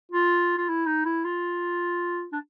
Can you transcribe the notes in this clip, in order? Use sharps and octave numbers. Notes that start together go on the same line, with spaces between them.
F4
F4
E4
D#4
E4
F4
D4